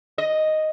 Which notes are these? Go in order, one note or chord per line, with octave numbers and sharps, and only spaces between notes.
D#5